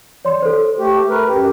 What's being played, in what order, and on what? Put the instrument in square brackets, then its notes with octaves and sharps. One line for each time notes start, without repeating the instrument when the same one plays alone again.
[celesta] C#5 D5 C6
A4 C5
[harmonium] A3 G4
A#4 B4
F#2 G4